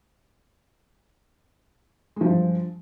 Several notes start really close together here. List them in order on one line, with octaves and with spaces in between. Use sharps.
G#3 F3 G2